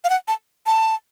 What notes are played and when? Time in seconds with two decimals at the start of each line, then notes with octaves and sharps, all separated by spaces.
0.04 F5
0.10 F#5
0.28 A5
0.66 A5